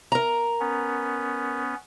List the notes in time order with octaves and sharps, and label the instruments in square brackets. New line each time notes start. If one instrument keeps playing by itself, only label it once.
[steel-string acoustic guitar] A#4 A#5
[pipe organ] B3 C#4